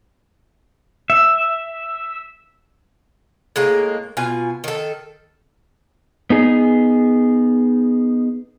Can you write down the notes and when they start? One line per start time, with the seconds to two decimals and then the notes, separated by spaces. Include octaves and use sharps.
1.10 E5
3.56 A2 G#3 A#3
4.17 B2 F4 G#5
4.64 D#3 A4
6.30 B3 D#4 G#4